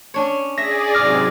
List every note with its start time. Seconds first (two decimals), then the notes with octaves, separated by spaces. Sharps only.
0.14 C#4 D4 C#5
0.58 G#4 D5 E5 A#6
0.94 G#2 C3 F#3 D6 F6 A#6